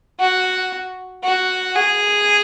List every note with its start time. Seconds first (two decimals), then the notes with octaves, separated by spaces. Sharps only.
0.20 F#4
1.24 F#4
1.76 G#4